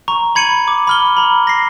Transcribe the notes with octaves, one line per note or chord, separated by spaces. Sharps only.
A#5 C#6
B5 G#6 C#7 D#7 F#7
D6
B5 F6 G7
A#5 B5
A#6 C7